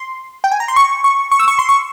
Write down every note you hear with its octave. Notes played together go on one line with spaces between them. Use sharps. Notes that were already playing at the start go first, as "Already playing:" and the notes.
Already playing: C6
G5
G#5
A#5
C6
C#6
C#6
C#6
E6
C#6
C6
C#6